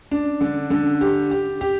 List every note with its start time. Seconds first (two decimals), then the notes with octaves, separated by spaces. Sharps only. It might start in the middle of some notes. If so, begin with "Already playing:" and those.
0.11 D4
0.41 D3
0.70 D3
1.01 G4
1.31 G4
1.61 G4